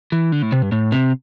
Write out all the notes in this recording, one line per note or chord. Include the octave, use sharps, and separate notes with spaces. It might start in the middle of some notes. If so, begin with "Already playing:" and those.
E3
D3
A2
C3
G2
A2
C3